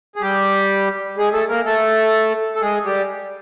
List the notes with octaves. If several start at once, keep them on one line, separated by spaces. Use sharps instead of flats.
G#4
G3 G4
G#3 G#4
A3 A4
A#3 A#4
A3 A4
A4
G#3 G#4
G3 G4